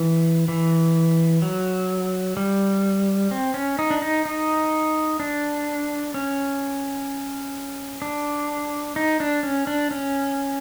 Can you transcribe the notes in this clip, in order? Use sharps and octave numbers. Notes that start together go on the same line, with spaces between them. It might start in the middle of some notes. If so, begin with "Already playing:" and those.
Already playing: E3
E3
F#3
G3
C4
C#4
D#4
D4
D#4
D#4
D4
C#4
D4
D#4
D4
C#4
D4
C#4